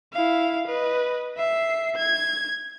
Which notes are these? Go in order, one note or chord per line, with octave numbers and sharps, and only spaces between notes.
E4 F5
B4 D#5
E5 C7
G#6